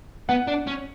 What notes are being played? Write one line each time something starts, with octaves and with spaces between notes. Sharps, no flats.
B3 F#5
D4
C#4